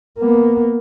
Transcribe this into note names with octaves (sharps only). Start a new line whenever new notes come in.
A#3 B3